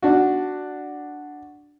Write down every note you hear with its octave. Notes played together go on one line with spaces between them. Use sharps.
D4 F#4